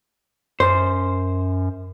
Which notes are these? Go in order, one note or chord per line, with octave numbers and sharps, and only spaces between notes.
F#2 C5